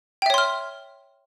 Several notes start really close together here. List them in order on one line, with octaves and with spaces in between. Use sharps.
G5 E5 C#5 C6 F6